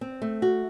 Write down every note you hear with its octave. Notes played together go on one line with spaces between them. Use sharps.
C4
A3
F#4